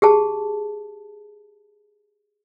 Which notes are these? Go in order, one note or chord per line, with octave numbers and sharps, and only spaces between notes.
G4 G#4 A5